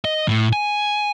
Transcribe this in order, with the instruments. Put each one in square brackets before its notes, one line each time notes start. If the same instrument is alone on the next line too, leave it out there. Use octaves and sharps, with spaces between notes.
[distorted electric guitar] D#5
A2
G#5